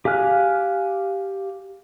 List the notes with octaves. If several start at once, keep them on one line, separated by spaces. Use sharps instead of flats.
G4 F5 G#5 F6 F#6